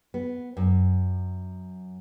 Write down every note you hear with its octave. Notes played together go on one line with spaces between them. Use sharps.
B3
F#2